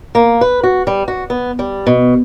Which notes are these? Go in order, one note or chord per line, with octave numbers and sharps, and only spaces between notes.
A#3
B4
F#4
G3
F#4
B3
G3
B2